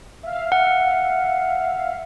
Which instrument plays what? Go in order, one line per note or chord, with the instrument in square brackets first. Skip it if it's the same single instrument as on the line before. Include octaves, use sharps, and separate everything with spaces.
[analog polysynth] E5 F5
[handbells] F#5